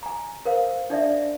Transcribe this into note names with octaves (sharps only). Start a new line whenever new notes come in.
G#5 A#5
A#4 C5 F5
D4 D#4 D5 E5